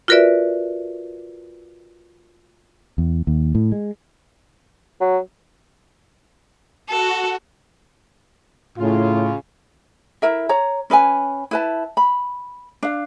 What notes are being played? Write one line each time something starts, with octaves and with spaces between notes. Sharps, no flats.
F4 F#4 A#4 B4 D5 E5
E2
D#2
A2
G#3
F#3
F#4 A4
A2 C#3 F4
E4 A#4 E5
C#5 A#5
C#4 B4 D#5 G#5
E4 B4 A5
B5
D4 F5